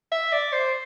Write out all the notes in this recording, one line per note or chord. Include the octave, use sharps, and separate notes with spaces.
E5
D5
C5